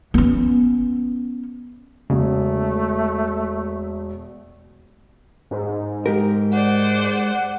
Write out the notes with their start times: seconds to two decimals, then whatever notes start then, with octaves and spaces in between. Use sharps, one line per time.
0.14 B3 C#4
2.10 E1 C#3 A3
5.51 G#2
6.06 G#3 G4 A#4
6.53 C5 D5 F#5